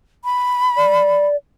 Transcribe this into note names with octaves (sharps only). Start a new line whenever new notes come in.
B5
D5